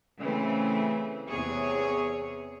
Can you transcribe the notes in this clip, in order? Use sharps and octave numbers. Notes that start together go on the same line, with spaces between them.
C#3 E3 A3 C4
E2 C3 G#4 C#5